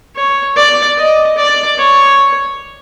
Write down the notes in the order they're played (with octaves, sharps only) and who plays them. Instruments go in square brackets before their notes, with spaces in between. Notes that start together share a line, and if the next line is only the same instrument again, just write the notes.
[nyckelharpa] C#5
D5
D#5
D5
C#5